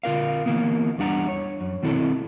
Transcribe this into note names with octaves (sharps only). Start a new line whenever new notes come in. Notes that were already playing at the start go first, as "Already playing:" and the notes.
D3 F4 A#4 F5
E3 A#3 B3
E2 G3 D4 F#5 A#5
C#5
F#2
B2 D#3 C4 E4 A4